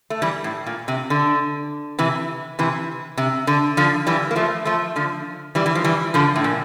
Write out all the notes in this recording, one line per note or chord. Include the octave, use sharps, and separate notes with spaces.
A3
E3 G3
A2
A#2
C3
D3
C3 E3
C3 E3
C3
D3
D3 F3
E3 G3
A#3
F3 A3
F3 A3
D3 F3
E3 G3
E3
F3
E3 G3
D3 F3
A2
A#2